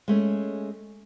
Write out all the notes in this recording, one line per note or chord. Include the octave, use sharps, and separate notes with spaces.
G#3 A3 C#4